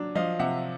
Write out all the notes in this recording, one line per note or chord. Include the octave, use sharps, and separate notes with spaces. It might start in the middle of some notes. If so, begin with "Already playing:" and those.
Already playing: F#3 D4
F3 D#5 F5
C3 E5 F#5